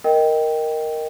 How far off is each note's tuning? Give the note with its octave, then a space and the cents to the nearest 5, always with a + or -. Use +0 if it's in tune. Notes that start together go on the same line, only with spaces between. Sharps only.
A#4 +0 D#5 +0 G5 +0